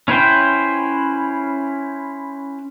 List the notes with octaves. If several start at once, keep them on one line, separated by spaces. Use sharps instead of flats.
C#4 E4 B4 C5 G5